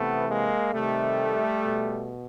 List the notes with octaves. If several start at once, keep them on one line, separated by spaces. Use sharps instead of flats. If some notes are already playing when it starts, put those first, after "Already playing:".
Already playing: C3 E3 A3 B3
G#3 A#3
C3 D#3 G3 A3
B2